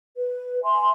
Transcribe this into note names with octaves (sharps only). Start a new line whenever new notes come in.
B4
E5 G#5 C6